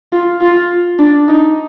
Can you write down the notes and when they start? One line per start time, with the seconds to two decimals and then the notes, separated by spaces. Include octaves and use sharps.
0.13 F4
0.41 F4
0.99 D4
1.29 D#4